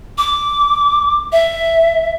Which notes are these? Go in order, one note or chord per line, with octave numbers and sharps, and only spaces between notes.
D6
E5